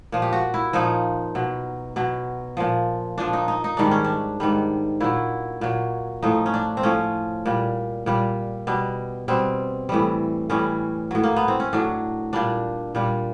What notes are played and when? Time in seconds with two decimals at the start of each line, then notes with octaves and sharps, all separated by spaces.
0.12 A#2 F3
0.22 G4
0.33 F#4
0.54 E4
0.73 A#2 F3 D#4
1.35 B2 F#3
1.96 B2 F#3
2.57 A#2 F3
3.18 A#2 F3 D4
3.33 D#4
3.48 D#4
3.64 D#4
3.77 G#2 D#3 G3 D4
3.91 C#4
4.04 D4
4.40 G#2 D#3 G3
5.00 A#2 F#3 E4
5.61 A#2 F#3
6.23 A2 F3 D#4
6.46 C#4
6.54 D4
6.77 C4
6.83 A2 F3 C#4
7.46 A#2 G3
8.06 A#2 G3
8.67 B2 G3
9.28 B2 G3 C4
9.89 A2 E3 G3
10.50 A2 E3 G3 C#4
11.11 A2 F#3
11.23 A#3
11.36 B3
11.48 C4
11.60 C#4
11.73 A2 F#3 D4
12.33 A#2 G3 D4
12.95 A#2 G3